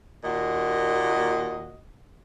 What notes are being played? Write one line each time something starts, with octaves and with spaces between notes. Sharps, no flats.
D#2 A#2 F#4 D#5